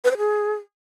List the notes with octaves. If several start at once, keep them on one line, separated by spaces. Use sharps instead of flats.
B4
C5
G#4